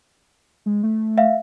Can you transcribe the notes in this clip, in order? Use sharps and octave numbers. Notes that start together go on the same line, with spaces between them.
G#3
A3
E5 F5